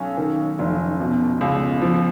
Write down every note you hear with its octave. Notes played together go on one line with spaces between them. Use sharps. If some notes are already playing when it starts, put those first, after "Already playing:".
Already playing: B1 C#4
D#3
F1
B2
C#2
F3